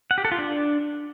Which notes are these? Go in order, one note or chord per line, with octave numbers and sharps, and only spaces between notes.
F#5
G4
A4
F4
D4